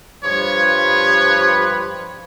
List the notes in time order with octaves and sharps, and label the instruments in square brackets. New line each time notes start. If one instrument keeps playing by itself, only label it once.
[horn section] G2 F3 B4 [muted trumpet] C#5